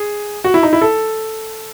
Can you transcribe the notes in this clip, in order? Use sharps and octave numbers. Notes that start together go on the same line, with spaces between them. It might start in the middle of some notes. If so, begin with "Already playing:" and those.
Already playing: G#4
F#4
E4
D#4
E4
A4